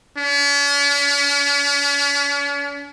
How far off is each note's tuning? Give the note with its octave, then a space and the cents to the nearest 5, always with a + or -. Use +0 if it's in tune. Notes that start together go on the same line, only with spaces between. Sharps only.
C#4 +45